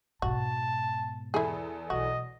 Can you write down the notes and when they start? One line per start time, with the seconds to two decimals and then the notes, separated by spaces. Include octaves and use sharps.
0.22 G#2 B2 F#4 A5
1.34 E2 E4 G#4 A4
1.90 B1 F#4 D#5